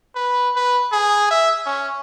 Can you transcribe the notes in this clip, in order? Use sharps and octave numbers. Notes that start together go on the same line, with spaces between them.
B4
B4
G#4
E5
C#4